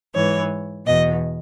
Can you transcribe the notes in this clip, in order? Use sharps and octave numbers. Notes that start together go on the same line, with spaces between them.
G#2 E3 C#5
E2 B2 D#5